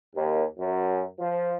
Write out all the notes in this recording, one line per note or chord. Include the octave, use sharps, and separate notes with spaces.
D#2
F#2
F3